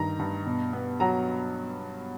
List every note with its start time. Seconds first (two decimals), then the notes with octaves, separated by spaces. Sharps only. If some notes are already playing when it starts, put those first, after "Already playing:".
Already playing: G2 D#3 A#5
0.19 G2
0.46 B2
0.73 B3
1.00 F#3 A#5